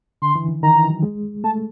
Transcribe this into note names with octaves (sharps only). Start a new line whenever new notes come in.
D3 C6
E3
D#3
D#3 A#5
E3
F#3
G#3
A3 A5